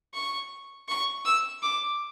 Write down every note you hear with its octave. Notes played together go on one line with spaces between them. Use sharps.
C#6
C#6
E6
D6